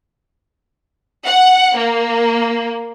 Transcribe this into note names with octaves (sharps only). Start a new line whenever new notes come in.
F#5
A#3